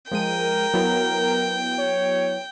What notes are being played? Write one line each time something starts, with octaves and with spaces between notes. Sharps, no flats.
F3 G#3 A#4 G5 D#7
F#3 B3 E4
C#5